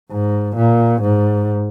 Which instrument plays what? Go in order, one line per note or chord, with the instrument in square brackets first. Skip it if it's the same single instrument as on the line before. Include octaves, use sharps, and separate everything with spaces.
[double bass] G#2
A#2
G#2